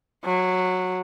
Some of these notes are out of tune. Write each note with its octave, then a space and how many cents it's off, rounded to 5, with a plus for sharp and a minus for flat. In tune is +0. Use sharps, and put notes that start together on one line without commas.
F#3 -10